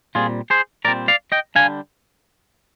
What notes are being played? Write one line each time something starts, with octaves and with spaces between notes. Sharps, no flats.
A#2 G3 C4 F4 G#4
G#4 C5
A#2 G3 C4 A#4 D5
D5 F5
D#5 G5
D3 G3 D4 F5 G#5